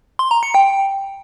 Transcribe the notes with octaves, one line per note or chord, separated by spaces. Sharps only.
C6
A#5
C#7
G5